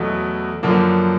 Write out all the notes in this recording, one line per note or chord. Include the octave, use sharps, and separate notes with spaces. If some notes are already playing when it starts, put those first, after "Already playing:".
Already playing: E2 B2 F#3 A3
F#2 D3 F3 A#3